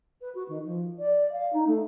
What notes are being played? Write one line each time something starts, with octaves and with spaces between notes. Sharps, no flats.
B4
F#4
D#3
F3
D5
F5
D#4
A3